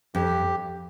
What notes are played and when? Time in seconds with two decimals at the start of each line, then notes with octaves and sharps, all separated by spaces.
0.15 F2 G4